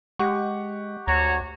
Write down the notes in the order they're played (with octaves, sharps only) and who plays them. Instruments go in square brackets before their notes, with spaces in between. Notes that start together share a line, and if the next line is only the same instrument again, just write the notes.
[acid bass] G#3 [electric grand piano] G4 F#5 C#6
[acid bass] D2 [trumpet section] F#4 C#5 A#5